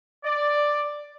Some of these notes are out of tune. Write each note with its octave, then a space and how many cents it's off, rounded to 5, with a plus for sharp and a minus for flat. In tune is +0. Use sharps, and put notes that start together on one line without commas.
D5 +5